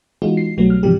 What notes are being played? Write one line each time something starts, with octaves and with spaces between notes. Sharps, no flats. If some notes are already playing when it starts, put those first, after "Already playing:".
E3 G#3 B3 D#4 F4 F#4
C7
C2 B2 F#3 G3 A3 B3
F6
G#2 C3 E3 F3 G3 G4